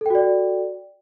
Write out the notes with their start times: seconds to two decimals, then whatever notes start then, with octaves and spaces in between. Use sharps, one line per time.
0.01 A4
0.06 G5
0.10 F#4
0.15 D5